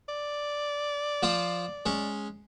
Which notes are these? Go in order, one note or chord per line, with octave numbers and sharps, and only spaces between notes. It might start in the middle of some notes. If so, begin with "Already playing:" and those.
D5
F3 F4 C5
G#3 C#4